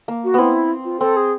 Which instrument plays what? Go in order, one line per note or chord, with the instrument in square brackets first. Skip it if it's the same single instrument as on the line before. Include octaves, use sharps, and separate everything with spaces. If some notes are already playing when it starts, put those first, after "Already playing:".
[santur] A#3
[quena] F#4
[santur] B3 C4 [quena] E4
[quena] F4
[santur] C4 [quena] A4
[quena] G#4